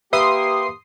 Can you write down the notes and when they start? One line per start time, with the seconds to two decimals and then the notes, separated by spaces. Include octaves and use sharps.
0.13 A#3 G4 B4 E5 C6 D#6 C7